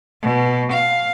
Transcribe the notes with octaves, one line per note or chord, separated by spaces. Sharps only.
B2
F5